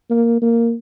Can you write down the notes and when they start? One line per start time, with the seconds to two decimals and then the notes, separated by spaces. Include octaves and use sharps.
0.10 A#3
0.42 A#3